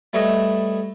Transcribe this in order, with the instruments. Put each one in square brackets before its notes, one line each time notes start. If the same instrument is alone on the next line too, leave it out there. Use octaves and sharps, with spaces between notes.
[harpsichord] G3 A3 B4 C#5 D#5 E5